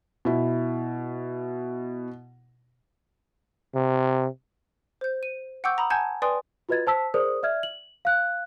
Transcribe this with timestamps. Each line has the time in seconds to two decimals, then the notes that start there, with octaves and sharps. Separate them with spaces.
0.25 B2 E4
3.75 C3
5.01 C5 G6
5.23 D#7
5.64 F#5 G5 C#6 D6 E6 G6
5.78 A#5 B5 D#6
5.90 F#5 G#5 A5 G6 G#6
6.22 B4 D5 G5 G#5 C6 D#6
6.69 F4 F#4 B4 D#5 G#6 A6
6.87 C5 A5 E6 B6
7.14 G#4 A#4 C5 D5 D#6
7.43 D5 E5 F6 G#6
7.63 F#7
8.05 F5 F#6